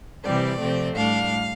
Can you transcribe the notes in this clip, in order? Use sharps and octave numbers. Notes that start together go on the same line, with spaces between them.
C3 E3 G3 C4 D5
C3 F3 A3 C4
A2 G3 D4 F5